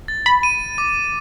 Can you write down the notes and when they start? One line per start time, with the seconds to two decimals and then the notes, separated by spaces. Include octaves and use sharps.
0.08 A6
0.26 B5
0.43 D#7
0.78 D6